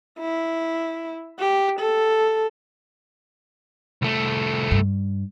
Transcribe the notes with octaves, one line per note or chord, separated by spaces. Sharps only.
E4
G4
A4
C2 A3
G2